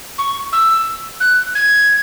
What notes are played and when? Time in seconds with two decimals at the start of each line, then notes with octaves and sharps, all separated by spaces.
0.18 C#6
0.53 E6
1.21 F#6
1.55 G#6